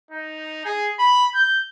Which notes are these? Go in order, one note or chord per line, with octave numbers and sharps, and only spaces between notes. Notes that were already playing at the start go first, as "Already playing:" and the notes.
D#4
G#4
B5
G6